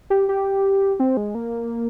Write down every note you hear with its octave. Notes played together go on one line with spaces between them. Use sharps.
G4
G4
C4
G#3
A#3